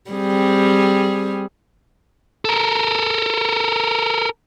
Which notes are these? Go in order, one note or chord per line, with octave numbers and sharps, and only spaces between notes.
G3 C4 G#4
A4 A#4